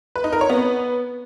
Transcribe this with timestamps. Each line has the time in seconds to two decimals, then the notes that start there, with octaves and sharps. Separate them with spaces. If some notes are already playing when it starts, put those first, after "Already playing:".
0.16 B4
0.24 D#4
0.33 A#4
0.41 C#5
0.50 B3